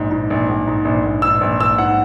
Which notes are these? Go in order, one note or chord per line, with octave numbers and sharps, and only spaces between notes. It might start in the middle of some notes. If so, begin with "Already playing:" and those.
Already playing: A#1 G#2
G#2
A#1
A#1
G#2
A#1
A#1
G#2 E6
A#1
A#1 E6
G#2 F#5